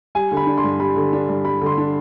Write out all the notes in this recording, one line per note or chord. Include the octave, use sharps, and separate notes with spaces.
G3 G#5
D3
B5
D4
C6
G2
G3 B5
D3
D4
G2
G3 B5
D3 C6
D4